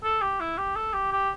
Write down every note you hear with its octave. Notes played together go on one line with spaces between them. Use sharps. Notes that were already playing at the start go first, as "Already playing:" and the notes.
A4
G4
E4
G4
A4
G4
G4